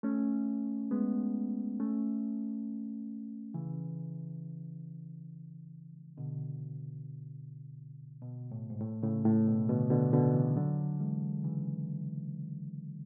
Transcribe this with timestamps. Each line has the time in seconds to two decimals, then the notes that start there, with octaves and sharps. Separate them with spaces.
0.03 A3 C#4
0.91 G#3 B3
1.80 A3 C#4
3.54 C#3 E3
6.17 B2 D3
8.22 B2
8.51 A2
8.70 G#2
8.80 A2
9.03 A2 C#3
9.25 A2
9.47 B2
9.69 B2 D3
9.90 B2 D3
10.12 B2 D3
10.34 C#3 E3
10.56 D3 F#3
11.00 E3 G#3
11.44 C#3 E3